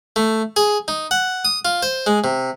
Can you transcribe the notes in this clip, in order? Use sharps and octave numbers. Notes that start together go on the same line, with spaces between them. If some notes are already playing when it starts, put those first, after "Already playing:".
A3
G#4
D#4
F#5
D#6
F4
C5
G#3
C3